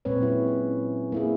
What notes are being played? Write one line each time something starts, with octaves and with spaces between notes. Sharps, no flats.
A#2 G#3 C4 B4 C#5
F#3 C#4 E4
C#4
A#3 E4 G#4